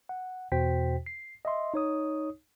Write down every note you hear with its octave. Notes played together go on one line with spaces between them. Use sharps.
F#5
E2 B2 F#4 C5 G5 B6
C7
D#5 E5 C6
D#4 C#5 D#6